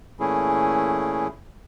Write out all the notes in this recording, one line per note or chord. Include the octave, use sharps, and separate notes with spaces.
A#2 E3 A3 C#4 E4 G#4